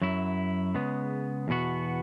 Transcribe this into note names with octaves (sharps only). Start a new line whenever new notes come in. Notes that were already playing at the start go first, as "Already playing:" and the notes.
F#2 F#3 E4
C#3 G#3 B3
E2 B2 B3 F#4